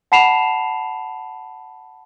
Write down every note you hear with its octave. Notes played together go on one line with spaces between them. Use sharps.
F#5 A5 B5 C7 E7 F7